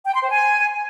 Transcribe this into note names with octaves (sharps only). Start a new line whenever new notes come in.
G5
C6
C5
G#5